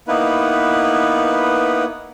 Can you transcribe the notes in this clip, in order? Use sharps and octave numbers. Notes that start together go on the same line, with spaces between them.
A#3 B3 D#4 E4 B4